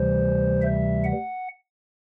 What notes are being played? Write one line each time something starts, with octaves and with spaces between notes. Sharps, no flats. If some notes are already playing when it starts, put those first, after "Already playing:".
Already playing: D2 C3 E3 G3 C5
E5
F#5